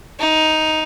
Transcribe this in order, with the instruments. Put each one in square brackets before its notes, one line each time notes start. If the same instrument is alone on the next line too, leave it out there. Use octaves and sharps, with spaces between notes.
[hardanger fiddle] D#4